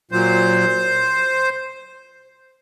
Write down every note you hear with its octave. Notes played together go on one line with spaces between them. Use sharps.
A#2 F#3 C5